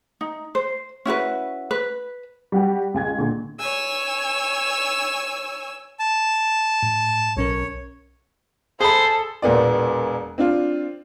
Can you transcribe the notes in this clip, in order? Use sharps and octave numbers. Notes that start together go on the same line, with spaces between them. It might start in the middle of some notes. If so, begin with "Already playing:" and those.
D#4
C5
C#4 E4 F#4 B4
B4
G3 F#4 G4
C#2 G#5 G#6
A#2 D3
C#5 G#5 E6
A5
A2
B1 C#4 A#4 C#5
G#4 A4 C5 B5
E1 A#2 B3 D5
C4 D4 F4